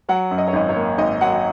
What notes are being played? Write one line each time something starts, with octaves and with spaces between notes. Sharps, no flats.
F#3 F#5
F#2
D#5
C#5
G#1 D#5
C#5
A#3
G#1 D#5
F#3 F#5